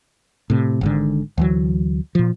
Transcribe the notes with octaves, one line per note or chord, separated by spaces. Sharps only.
A2 C3
G#1 G#2 D3
D2 E3 F#3
A#2 F3